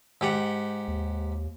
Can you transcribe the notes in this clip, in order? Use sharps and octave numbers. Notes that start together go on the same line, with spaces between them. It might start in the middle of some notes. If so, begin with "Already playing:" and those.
G#2 G4 F#5
D#2